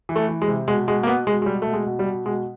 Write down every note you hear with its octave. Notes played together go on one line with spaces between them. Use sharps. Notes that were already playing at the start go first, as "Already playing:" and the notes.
E3
A3
E3
G#3
C3
B2 G#3
B2 G#3
A#3
B2 B3
B2 G#3
G#3
B2 G3
B2 A3
G#3
B2
G3
B2
B2 G#3